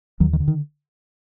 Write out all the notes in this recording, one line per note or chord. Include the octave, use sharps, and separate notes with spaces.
D#2 D#3 F#3
D#3
D3
D#3